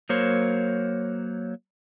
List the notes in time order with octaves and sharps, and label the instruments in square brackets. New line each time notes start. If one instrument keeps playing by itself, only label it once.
[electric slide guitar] F#3 A#3 A#4 C5 C#5